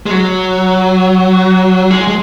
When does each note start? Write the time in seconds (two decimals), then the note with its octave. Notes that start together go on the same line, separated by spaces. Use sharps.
0.06 G#3
0.11 F#3
1.91 G#3
2.08 G#3